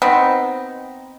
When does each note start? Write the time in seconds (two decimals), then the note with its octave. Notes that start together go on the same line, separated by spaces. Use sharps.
0.02 B3 C4 D#4